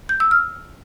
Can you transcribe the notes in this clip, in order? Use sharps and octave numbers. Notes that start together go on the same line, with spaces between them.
G6
E6
F6